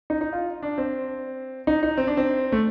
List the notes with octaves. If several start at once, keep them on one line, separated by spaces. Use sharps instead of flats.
D#4
D#4
F4
D4
C4
D#4
D#4
C4
D4
C4
A3